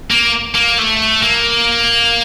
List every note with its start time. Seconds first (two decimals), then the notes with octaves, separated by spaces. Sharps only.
0.11 A#3
0.55 A#3
0.79 A3
1.23 A#3